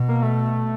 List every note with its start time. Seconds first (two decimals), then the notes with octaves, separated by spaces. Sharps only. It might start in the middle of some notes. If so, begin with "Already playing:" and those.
Already playing: B2
0.09 A#3
0.22 A3